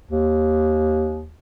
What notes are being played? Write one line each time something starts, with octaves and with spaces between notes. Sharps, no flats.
D#2